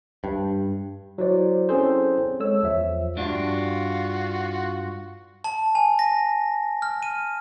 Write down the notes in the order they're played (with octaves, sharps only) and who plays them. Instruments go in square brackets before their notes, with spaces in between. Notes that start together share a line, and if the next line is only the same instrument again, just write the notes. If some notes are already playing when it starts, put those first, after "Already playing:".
[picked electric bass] G2
[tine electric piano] F#3 E4 C5 D5
C4 C#4 E4 G#4 A4 C5
G#3 A4 C#5 E6
E2 F3 E5
[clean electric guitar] G2 D4 [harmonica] F4 F#4
[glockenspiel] A5
G#5
A#6
F6
D#7